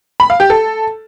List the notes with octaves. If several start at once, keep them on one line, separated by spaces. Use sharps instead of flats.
B5
F5
G4
A4